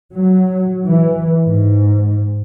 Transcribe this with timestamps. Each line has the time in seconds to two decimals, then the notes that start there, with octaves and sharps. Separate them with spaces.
0.14 F#3
0.85 E3
1.45 G#2